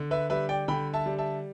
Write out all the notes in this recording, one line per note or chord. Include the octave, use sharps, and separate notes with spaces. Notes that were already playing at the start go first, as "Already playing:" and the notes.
Already playing: D3
B4 E5
G3 B4 E5
D5 G5
D3 G5 B5
E5 A5
G3
E5 A5